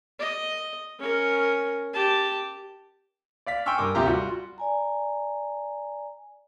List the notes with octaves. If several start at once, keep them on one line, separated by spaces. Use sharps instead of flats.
D#5
C#4 A#4
G4 A5
D5 F5 B6
G5 G#5 C6 C#6 E6 F6
G2 A#4 D6
D1 D2 C3 F4 G4 A#5
G3 F4 F#4
D5 G#5 A#5